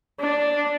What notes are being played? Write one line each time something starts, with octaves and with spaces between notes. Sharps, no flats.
D4